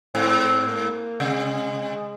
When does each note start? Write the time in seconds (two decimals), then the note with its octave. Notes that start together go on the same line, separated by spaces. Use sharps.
0.15 G#2 C4
0.67 A#3
1.20 C3 G#3